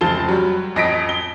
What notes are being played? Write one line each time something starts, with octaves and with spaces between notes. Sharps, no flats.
F1 C#2 F3 A5 G7
F#3 G3
A1 F2 D#5 A#6 B6 D7
G7